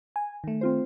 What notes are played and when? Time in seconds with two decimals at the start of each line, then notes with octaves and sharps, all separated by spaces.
0.16 G#5
0.44 D#3 A3
0.61 C4 F4 C5